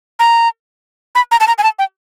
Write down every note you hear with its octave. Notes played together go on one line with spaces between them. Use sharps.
A#5
B5
A#5
A5
A#5
G#5
A5
G5